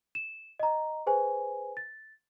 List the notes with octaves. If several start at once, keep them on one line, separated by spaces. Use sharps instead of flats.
E7
D#5 A#5
G#4 B4 C5 G#5
A6